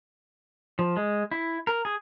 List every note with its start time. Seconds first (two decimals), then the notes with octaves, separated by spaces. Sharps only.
0.79 F3
0.97 G#3
1.31 E4
1.67 A#4
1.85 G#4